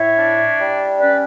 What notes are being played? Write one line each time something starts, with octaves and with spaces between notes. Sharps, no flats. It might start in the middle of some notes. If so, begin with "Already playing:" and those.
Already playing: A2 C#5 E5
D4
G3
C#4 B4 D5